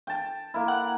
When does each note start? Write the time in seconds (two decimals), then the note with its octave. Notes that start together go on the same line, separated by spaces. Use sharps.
0.07 G5 A5
0.54 A#3 E4
0.68 F#5